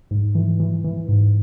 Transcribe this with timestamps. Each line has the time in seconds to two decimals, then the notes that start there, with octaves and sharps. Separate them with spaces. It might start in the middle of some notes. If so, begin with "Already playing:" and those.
0.11 G#2
0.35 E3
0.60 E3
0.84 E3
1.09 G#2